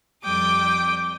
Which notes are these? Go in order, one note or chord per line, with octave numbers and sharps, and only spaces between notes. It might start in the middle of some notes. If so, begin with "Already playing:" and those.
F2 G3 G5 D6 D#6